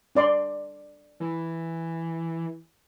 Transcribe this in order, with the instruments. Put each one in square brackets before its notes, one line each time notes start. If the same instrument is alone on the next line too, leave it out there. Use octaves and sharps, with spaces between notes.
[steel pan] D4 D5 C6
[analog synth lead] E3